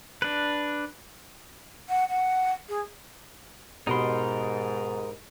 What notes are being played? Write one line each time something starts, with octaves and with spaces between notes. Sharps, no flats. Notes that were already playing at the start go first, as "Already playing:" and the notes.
D4 B4
F#5
F#5
G#4
G#2 B2 D#4 G4 A#4 B5 C6